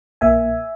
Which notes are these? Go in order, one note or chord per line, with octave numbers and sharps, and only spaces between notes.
A#1 A#2 A#3 E5 G#5